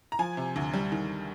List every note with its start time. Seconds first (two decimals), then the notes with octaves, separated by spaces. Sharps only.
0.12 A#5
0.19 F3 G#5
0.37 C3
0.56 D2
0.73 G3
0.92 D#3